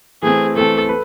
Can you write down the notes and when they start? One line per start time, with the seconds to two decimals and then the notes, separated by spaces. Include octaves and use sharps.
0.23 E3 A3 C4 G#4
0.56 E3 A3 C4 A4
0.89 B4